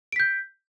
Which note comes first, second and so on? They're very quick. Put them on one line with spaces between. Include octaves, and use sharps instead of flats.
D7 B6 G6